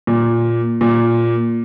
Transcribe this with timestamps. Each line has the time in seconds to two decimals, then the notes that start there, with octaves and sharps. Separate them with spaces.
0.07 A#2
0.81 A#2